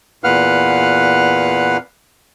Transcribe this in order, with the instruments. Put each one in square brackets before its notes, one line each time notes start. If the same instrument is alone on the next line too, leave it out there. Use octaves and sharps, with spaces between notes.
[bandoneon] E2 A#2 B4 F5 F#5 F6